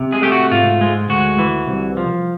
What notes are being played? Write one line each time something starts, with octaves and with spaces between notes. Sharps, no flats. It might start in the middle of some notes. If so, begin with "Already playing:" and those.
Already playing: C3
G#3 G#4
A3 G4
F#4
G#2 F4
G#3
D2 F#4
E3
C2
F3